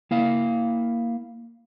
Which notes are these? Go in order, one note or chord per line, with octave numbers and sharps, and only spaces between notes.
A#3 E4 F5